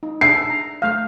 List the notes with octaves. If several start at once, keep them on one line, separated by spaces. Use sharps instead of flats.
D#4
D4 G#4 E5 C7
A#5
A3 F5